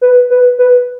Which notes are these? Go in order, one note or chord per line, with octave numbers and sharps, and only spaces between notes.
B4
B4
B4